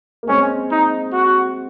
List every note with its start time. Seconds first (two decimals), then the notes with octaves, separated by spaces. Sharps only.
0.23 A#3
0.28 G#3 C4 C#4
0.71 D#4
1.13 F#4